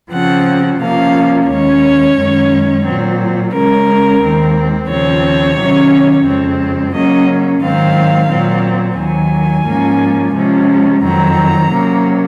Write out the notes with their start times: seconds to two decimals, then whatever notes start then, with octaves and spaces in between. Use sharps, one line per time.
0.12 C#3 F3 C4 F#5
0.80 C3 F3 A#3 C#4 F5
1.48 D#2 D#3 G#3 C#4 C#5
2.16 F#2 D#3 G#3 C#4
2.85 A#2 F#3 C4
3.53 C#3 G#3 C#4 A#4
4.21 D#2 D#3 G#3 C4
4.89 D#2 C#3 F3 C4 C#5
5.57 C3 D#3 F#3 C#4
6.25 F2 C#3 G#3 C4
6.94 C#3 F#3 A#3 C#4 D#5
7.61 G#2 D#3 F#3 C4 F5
8.30 A#2 F#3 C4
8.98 D#2 D#3 F#3 G#5
9.66 G#2 F3 A#3 C#4
10.35 C3 F3 G#3 C#4
11.03 F2 D#3 F#3 C4 A#5
11.71 C3 F#3 A#3 C#4